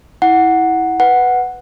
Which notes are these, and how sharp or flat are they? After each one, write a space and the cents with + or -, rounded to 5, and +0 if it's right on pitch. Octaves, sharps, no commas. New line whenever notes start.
E4 -15 F#5 +0
B4 +0 F#5 +0